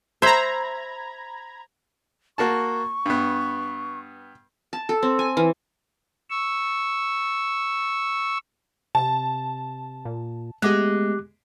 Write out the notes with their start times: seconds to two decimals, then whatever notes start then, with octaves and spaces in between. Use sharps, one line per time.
0.22 C5 E5 A#5 B5 G#6
2.38 A#3 F#4 A5 C#6
3.06 G2 B3
4.73 A5
4.89 A4
5.03 C4
5.19 G#5
5.37 E3
6.30 C#6 E6
8.95 C3 A5
10.05 A#2
10.62 G#3 A3 B3 G4 D6 F#6